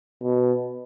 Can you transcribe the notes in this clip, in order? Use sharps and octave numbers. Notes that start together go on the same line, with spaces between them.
B2